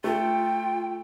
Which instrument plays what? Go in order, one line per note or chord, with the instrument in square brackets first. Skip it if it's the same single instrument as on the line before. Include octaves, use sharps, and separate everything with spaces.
[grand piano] A3 [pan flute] F4 [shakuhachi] G5